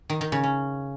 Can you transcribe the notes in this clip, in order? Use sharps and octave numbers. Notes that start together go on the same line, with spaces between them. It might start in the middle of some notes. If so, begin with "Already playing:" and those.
D#3
D#3
C#3
C#4